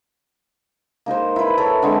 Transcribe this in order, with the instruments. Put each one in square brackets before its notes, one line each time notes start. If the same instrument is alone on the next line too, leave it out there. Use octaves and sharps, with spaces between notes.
[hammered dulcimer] A#3 D#4 A#4 C5
E4 B4
A4 C#5 E5
D3 G#3 C4